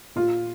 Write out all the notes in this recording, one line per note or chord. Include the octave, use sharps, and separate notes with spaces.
A#2 F4